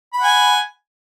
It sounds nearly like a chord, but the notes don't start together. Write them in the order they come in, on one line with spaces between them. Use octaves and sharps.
B5 F#5 G#5